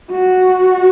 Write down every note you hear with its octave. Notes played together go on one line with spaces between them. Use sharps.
F#4